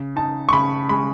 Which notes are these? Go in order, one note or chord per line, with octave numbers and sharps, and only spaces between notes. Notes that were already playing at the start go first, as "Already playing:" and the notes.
Already playing: C#3
D#4 A5
C#6
C#3 B5
G#3 B5